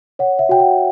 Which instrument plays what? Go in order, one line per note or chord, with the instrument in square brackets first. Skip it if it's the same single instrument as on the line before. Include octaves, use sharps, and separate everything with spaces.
[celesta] C#5 F#5
E5
F#4 G5
F#5